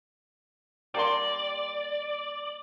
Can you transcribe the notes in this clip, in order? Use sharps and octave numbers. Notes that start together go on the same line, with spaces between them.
G3 A#3 D5 C6